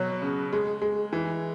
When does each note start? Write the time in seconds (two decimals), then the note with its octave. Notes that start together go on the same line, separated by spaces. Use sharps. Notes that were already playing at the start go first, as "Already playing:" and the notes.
Already playing: B2 F#3
0.22 C#3
0.53 G#3
0.82 G#3
1.13 E3